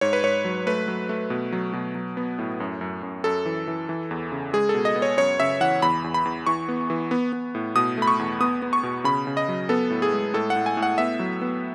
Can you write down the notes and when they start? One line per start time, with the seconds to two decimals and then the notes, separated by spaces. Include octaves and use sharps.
0.01 G#2 C#5
0.13 B4
0.23 G#2 C#5
0.45 F#3
0.67 A3 B4
0.88 F#3
1.09 A3
1.30 B2
1.52 F#3
1.73 B2
1.95 F#3
2.17 B3
2.39 A2
2.60 F#2
2.81 F#2
3.03 F#2
3.24 F#2 A4
3.45 E3
3.68 E3
3.89 E3
4.11 E2
4.32 C#3
4.53 G#3 G#4
4.69 B2 A4
4.85 D#5
4.96 B3
5.02 C#5
5.17 F#2 C#5
5.40 C#3 E5
5.61 E3 F#5
5.82 E2 B5
6.04 E2
6.14 B5
6.25 E2
6.47 E3 C#6
6.69 B3
6.90 E3
7.11 B3
7.33 B3
7.55 A2
7.75 B2 D#6
7.98 A3 B5
8.07 C#6
8.19 E2
8.40 B3 D#6
8.62 B3
8.73 C#6
8.83 B2
9.04 C#3 B5
9.27 C#3
9.37 D#5
9.48 F#3
9.69 B3 A4
9.90 A2
10.02 G#4
10.12 G#3
10.34 A2 A4
10.50 F#5
10.56 A2
10.66 G#5
10.77 A2
10.83 F#5
10.98 B3 E5
11.19 F#3
11.42 B3